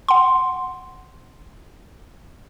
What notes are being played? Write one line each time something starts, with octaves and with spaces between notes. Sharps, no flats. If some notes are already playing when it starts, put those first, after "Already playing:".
F#5 C6